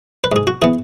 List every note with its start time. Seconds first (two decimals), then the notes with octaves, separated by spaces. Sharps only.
0.24 B4
0.32 G#2 G#4
0.47 F#4
0.62 E3 B3 G#4